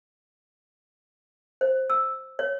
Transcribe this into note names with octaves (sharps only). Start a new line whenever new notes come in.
C5
E6
C#5